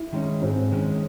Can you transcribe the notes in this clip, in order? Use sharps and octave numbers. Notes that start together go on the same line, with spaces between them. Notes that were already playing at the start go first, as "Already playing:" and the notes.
Already playing: E4
D#3 G#3 C#4
G#2 C4
D#3 G#3 C#4